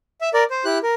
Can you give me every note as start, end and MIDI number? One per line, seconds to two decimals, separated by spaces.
0.21 0.29 76
0.34 0.44 70
0.34 0.44 74
0.50 0.65 72
0.65 0.78 64
0.65 0.78 67
0.65 0.78 90
0.83 0.95 70